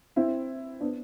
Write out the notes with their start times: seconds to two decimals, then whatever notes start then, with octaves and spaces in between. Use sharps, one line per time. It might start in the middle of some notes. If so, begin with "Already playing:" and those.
0.16 C4 E4
0.80 B3 D4